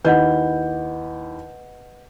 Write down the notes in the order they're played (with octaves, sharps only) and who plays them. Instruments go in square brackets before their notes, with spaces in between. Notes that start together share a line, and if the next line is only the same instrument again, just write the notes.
[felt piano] D#2 E4 G6 [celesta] B4 D#5 F#5